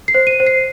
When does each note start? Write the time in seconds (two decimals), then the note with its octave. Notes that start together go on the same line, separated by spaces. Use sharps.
0.08 C7
0.14 C5
0.27 D#7
0.40 C5
0.47 C7